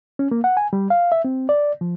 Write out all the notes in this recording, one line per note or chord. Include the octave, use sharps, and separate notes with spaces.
C#4
A#3
F#5
G#5
G3
F5
E5
C4
D5
F3